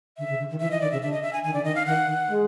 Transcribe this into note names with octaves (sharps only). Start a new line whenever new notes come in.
D3 E5
C#3
D3
D#3
E3 E5
E3 D#5
D#3 D5
C#3 E5
D3 E5
D#5
E5
G#5
D#3 G#5
D3 D5
D#3
D#5
F5
D#3 F#5
D#3
G#3